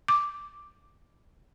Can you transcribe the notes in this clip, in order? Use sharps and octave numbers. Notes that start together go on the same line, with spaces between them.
D6